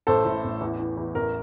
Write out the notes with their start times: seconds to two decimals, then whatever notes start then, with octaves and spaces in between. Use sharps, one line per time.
0.07 A1 A4 C5
0.25 A2
0.44 A1
0.61 E2
0.79 E3
0.97 E2
1.15 A1 A#4